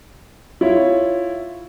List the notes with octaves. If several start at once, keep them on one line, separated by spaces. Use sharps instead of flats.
E4 F4 C#5